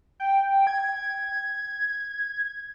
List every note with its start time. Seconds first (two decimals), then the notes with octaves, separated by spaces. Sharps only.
0.20 G5
0.67 G#6